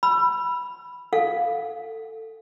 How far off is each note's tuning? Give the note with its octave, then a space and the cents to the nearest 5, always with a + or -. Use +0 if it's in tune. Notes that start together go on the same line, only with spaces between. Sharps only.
B5 -5 E6 +30
A4 +20 F5 +0